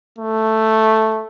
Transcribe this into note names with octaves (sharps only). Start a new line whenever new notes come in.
A3